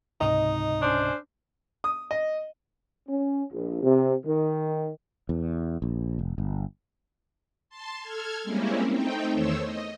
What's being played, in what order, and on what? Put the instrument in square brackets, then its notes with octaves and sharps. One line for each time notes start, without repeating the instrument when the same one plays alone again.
[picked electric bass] C#2 G#2 C3 [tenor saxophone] D#4 [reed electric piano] D#5
[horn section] C#4 D4 C5
[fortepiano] D#6
D#5
[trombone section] C#4
A#1
C3
D#3
[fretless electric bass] E2
A#1
F1
G1
[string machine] A5 C6
A4 F6 G#6
G3 G#3 A#3 C4 C#4 E4
A3 C4 D#4 G5
E2 D#3 A3 C5 C#5 E6
D#5